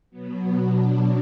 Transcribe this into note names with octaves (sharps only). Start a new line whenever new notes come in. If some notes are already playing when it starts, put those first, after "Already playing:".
B2 F#3 B3
B2 F#3 D4